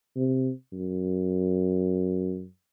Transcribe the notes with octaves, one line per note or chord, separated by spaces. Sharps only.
C3
F#2